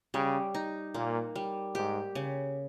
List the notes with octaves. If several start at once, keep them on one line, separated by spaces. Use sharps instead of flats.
C#3 G3
D#4
A#2 A#3
G3
G#2 G4
C#3